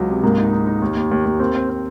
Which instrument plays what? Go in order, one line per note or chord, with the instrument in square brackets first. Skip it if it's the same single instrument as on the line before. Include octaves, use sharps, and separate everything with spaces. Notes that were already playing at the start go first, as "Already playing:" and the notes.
Already playing: [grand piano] C#2 [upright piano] F#3
[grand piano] C3
[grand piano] G#2 [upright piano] A#3
[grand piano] D#4
D#4
D#4
D#2
D#2
D#2
D#2
[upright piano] A#3 [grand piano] C4
[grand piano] C4
C4